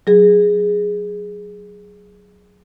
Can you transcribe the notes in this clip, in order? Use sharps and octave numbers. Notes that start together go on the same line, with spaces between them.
F#3 G#4